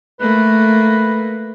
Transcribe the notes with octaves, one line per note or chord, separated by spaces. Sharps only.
A3 A#3 B4